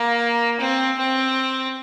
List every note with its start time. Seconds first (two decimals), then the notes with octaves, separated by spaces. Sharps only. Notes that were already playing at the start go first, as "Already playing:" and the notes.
Already playing: A#3
0.60 C4
0.98 C4